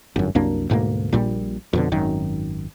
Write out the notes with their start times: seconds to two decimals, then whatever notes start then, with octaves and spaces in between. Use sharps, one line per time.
0.16 G1 F#2
0.35 C2 F#2 A#3 D4
0.70 D2 G#2 B2 A#3
1.12 A#1 A#2 G3
1.73 F2 B2 D3
1.92 G#1 F#2 D#3